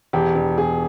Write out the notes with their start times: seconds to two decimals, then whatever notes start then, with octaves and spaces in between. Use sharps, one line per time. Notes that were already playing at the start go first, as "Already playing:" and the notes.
0.13 E1 G4
0.35 E1
0.57 E1 G#4